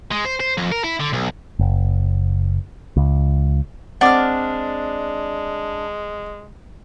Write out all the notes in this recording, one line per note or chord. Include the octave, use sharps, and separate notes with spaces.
G#3
C5
C5
F2
A#4
E4
D3
B1
F#1
C#2
G#3 C4 D4 F#5 D6 F6